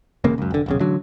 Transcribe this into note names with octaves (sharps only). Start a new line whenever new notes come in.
E1 A1 C#3 A#3
C#2 F#2
F1 D3
D#1 B1 C#3
A1 D3 F#3